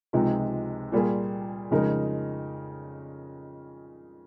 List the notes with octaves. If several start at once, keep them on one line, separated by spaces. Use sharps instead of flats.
C#2 C3 F3 G#3 D#4
A#2 G3 A#3 F4 G#4
F2 C#3 G#3 D#4 A#4